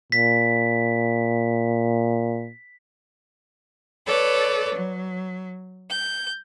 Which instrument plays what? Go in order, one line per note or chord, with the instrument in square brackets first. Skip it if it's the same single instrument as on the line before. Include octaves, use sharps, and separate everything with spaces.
[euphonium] A#2 [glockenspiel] B6
[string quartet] A4 B4 C#5 D5
F#3
G6